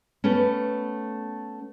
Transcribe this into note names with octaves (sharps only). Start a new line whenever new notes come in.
A3 B3 C#4